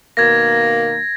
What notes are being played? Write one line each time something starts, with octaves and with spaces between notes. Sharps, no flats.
B2 D#3 A#3 G#6 A#6